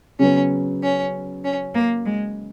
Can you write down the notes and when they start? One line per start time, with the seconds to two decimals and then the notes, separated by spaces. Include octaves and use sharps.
0.19 C#3 F#3 B3 C#4
0.82 C#4
1.44 C#4
1.74 A#3
2.05 G#3